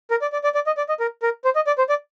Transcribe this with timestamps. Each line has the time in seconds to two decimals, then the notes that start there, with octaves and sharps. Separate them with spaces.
0.11 A#4
0.22 D5
0.32 D5
0.44 D5
0.55 D5
0.67 D#5
0.77 D5
0.89 D#5
1.00 A#4
1.22 A#4
1.45 C5
1.56 D#5
1.67 D5
1.78 C5
1.89 D5